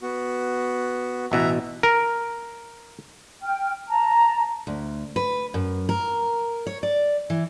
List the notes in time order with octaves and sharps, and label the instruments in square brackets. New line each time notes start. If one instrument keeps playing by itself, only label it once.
[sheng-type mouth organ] B3 F#4
[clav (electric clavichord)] A1 B2 E3 [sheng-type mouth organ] E5 F#5 A#5
[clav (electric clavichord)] A#4
[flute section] G5 F6
A5 A#5
[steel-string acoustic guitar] D2
B4
F#2
A#4
C#5
D5
E3